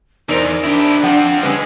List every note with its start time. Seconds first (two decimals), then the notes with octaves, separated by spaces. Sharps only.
0.29 E2 D#4 A#4 C5 D5
0.64 D4 E4 G4
1.04 F3 C4 F#5
1.43 D3 G#3 C#4 G#4 B4